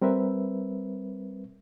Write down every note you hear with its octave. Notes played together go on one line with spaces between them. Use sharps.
G3 C4 A#4 B4 E5